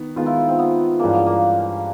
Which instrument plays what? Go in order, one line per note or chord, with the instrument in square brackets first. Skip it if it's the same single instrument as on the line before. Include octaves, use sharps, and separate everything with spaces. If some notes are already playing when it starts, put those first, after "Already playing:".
Already playing: [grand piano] D#3 B3
[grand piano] D#3 G#3 B3 [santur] F4
[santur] E4
F4
C4
B3
[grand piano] G2 E3 G#3 C#4 [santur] A#3
[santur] B3
A#3